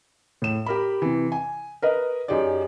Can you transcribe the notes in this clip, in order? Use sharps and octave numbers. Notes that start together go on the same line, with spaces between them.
A2 E7
G4 A#4 B5
C3 E3
G#5
A#4 B4 D#5
F#2 D#4 G4 G#4 D5